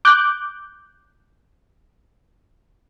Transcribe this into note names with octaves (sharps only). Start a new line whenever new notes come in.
D6 F#6 G6